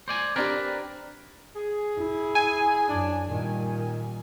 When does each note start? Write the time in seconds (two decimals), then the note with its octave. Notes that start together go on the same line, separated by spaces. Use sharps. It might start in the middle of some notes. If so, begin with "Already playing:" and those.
0.08 C5 D5 G#5
0.36 C4 D4 G4 A#4 B4 D5
1.56 G#4
1.98 E4
2.35 G#5
2.88 F#2 D4
3.28 A#2 D#3 G3